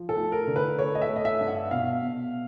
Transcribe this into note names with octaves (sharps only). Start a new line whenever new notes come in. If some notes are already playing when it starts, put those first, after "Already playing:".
Already playing: F3
A4
A3
A#4
D3
B4
A3 C#5
D#5
E5
A3
D#5
E5
G2
F#5
B2 F5
B2